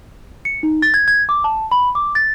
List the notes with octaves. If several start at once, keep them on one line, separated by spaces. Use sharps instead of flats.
C#7
D#4
A6
G#6
G#6
D6
A5
B5
D6
A6